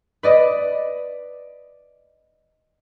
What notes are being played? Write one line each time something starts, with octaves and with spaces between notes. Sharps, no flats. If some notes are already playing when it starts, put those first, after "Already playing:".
B4 D5 D#5